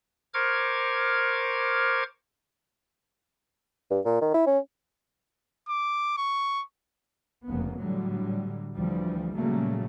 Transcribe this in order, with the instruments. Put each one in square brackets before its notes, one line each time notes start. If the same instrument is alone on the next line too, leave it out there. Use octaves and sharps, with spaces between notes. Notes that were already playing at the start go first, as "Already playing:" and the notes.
[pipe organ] A#4 C5 C#6 D6 F6 G#6
[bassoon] G2
A#2
D#3
E4
C#4
[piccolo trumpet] D6
C#6
[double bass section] F1 C#3 A#3 B3
A2 D3 F#3 G3
D2 E3 F3 G3
A#2 C#3 F#3 G3 A3 A#3